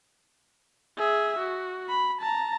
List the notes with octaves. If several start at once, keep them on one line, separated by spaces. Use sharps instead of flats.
G#4 E5
F#4
B5
A5 A#5